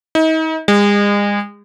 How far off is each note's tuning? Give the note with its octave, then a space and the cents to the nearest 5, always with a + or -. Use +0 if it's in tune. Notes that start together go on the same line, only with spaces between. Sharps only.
D#4 +40
G#3 -35